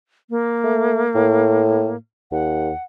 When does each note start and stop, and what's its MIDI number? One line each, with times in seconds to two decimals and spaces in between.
0.30 1.96 58
0.64 1.03 57
1.15 1.94 45
2.32 2.71 39
2.32 2.84 78